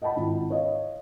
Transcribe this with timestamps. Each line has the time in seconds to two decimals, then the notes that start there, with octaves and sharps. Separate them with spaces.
0.02 D#5 F#5 G5 A5 B5
0.16 G#1 E4 F4
0.50 C#5 D#5 F5